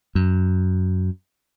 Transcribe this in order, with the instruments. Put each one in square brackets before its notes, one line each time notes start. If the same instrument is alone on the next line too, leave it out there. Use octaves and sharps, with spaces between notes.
[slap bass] F#2